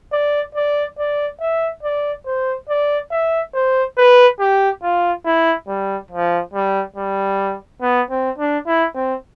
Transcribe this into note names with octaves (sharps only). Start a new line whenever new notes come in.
D5
D5
D5
E5
D5
C5
D5
E5
C5
B4
G4
F4
E4
G3
F3
G3
G3
B3
C4
D4
E4
C4